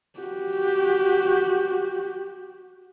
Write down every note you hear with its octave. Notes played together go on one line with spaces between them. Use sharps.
F#4 G4